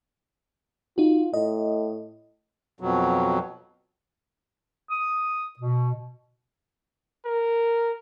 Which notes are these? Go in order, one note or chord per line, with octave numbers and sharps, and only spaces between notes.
D#4 F4 F#4
A2 D#5
F2 B2 F#3
D#6
B2
A#4